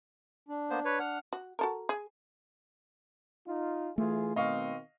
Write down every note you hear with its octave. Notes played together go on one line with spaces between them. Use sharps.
D4
A#3 B3 C5
B4 C#5
F#5 F6
F#4
F#4 A4 A#4
G#4
D#4 F4
E3 A3 F4 G#4
B2 D#3 C4 D#5 F5 C#6